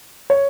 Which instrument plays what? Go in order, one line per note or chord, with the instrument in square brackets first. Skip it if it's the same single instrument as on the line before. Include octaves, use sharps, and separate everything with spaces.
[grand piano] C#5